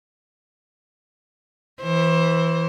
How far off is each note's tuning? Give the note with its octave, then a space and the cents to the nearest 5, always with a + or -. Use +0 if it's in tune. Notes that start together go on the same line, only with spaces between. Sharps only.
E3 +0 C5 +25